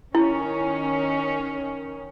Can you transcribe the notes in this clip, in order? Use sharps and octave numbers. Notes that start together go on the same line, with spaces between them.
D#3 C#4 E4